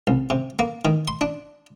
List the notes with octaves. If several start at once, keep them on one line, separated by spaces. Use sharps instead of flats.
C2
C3
A#3
D#3
C6
D4